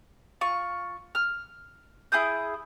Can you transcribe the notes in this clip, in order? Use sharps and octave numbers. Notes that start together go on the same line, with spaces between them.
F4 C#6
F6
E4 G#4 D#6 G6